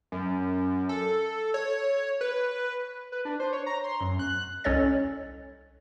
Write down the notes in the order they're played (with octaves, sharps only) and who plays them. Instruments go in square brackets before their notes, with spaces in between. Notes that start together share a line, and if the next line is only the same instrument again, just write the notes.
[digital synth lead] F#2
A4
C#5
B4
[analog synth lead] B4
D4
C5
C#5
A#5
C6
F#2
F#6
[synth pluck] C2 C#4 A4 C#5 D#5 A6